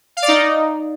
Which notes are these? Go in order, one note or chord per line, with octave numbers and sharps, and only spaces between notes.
F5
D5
D#4